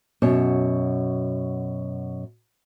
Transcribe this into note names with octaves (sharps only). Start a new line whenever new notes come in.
F#2 B2 C#5